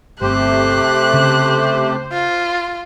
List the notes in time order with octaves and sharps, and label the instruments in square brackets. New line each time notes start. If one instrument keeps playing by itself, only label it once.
[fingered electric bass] G1 [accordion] C3 A3 G4 [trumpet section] C5 [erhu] F#6
[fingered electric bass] C#3
[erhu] F4